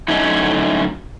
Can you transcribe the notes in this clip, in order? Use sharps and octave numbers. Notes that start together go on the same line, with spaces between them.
D3 F#3 A3 C#4 D#4 E4